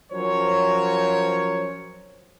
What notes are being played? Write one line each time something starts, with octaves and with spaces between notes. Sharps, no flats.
F3 F#3 C#4 A#4 C5 C#5